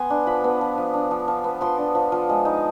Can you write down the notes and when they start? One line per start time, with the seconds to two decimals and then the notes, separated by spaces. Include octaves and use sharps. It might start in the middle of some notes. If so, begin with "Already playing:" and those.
Already playing: B3 G#5 C6
0.10 D4
0.26 F3 B5
0.44 B3
0.61 F3
0.78 F3
0.94 D4
1.11 F3
1.28 F3
1.44 B3
1.61 F3 C6
1.78 D4
1.95 F3
2.12 F3
2.29 G#3
2.45 D#4